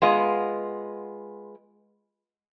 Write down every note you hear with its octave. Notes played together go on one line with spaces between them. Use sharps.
G#3 B3 F4 D#5